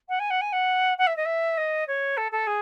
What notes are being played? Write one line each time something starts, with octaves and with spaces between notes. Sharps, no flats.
F#5
G#5
F#5
G#5
F#5
F#5
E5
D#5
E5
D#5
C#5
A4
A4
G#4